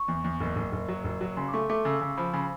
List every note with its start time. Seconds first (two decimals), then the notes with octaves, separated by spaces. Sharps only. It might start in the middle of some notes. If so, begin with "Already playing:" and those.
Already playing: C#6
0.08 E2
0.24 E2
0.41 F#1
0.56 F#1
0.72 F#1
0.89 F#3
1.04 F#1
1.21 F#3
1.36 C#3 C6
1.48 D6
1.53 A3 C#6
1.70 A3 D6
1.85 C#3 E6
2.01 C#3
2.17 F3 B5
2.33 C#3 B5